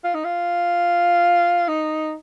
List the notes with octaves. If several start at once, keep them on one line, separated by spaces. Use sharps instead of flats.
F4
D#4
F4
D#4